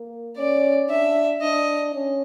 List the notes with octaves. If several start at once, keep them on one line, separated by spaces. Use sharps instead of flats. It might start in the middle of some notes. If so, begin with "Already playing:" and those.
Already playing: A#3
C#4 D5
D4 E5
D4 D#5
C#4